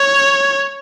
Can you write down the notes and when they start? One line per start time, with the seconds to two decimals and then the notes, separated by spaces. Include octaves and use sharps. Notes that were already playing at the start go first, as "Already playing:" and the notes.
Already playing: C#5